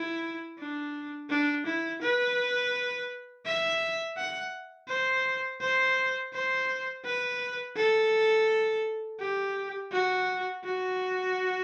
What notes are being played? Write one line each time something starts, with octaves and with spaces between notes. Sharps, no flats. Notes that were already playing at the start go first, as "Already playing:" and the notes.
Already playing: E4
D4
D4
E4
B4
E5
F#5
C5
C5
C5
B4
A4
G4
F#4
F#4